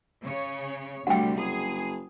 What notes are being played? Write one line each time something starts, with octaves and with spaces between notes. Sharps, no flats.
C#3 C#5
D2 C3 G3 A3 F#5 G5
F#1 G#4